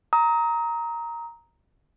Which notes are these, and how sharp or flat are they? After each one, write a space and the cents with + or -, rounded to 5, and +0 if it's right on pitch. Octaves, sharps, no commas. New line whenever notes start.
A#5 +0 D#6 +35